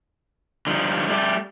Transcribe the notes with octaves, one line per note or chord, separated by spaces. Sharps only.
D3 F3 G3 D#4
G3 A3 E4 G4